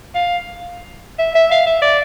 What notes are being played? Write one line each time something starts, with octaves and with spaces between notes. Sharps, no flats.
F5
E5
E5
F5
E5
D5